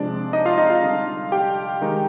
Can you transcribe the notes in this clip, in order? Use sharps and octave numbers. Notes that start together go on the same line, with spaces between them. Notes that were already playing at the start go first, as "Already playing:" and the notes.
Already playing: C3 F3 G#3 D4 D5
D#4 D#5
F4 F5
D#4 D#5
F4 F5
D3 G3 D4
G4 G5
D#3 G#3 D#4